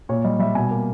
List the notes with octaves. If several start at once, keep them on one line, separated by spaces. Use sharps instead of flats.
A#2 C#5
G3 D#5
G3 E5
B2 G#5
A#3